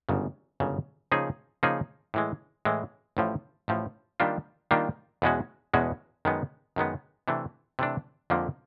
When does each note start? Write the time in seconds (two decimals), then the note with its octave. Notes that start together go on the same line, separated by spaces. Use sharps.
0.09 G1 F#2 C#3
0.60 G1 F#2 C#3
1.12 C#3 F3 A#3 D#4 G#4
1.63 C#3 F3 A#3 D#4 G#4
2.14 A2 E3 G#3
2.65 A2 E3 G#3
3.17 A1 A2 F3
3.68 A1 A2 F3
4.20 D#3 G3 A#3 D4 F4
4.71 D#3 G3 A#3 D4 F4
5.22 E2 B2 G#3 C#4 F#4
5.74 E2 B2 G#3 C#4 F#4
6.25 F#2 D#3 G#3 B3
6.76 F#2 D#3 G#3 B3
7.28 C3 E3 A3 D4
7.79 C3 E3 A3 D4
8.30 F2 D3 F3 A#3